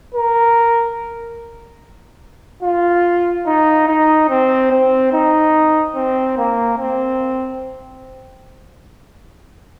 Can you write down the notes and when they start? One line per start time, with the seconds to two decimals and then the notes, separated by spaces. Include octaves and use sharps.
0.14 A#4
2.63 F4
3.46 D#4
3.87 D#4
4.29 C4
4.72 C4
5.12 D#4
5.95 C4
6.37 A#3
6.78 C4